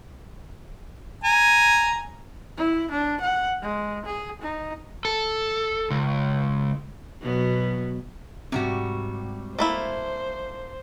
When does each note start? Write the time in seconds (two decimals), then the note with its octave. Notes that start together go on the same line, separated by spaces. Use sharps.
1.24 G#5 A#5
2.57 E4
2.91 D4
3.20 F#5
3.61 G#3
4.05 G#4
4.41 D#4
5.05 A4
5.90 C#2
7.21 B2 F#3 B3
8.52 G#2 C3 G3 C4 F#4
9.59 A3 A#3 E4 C5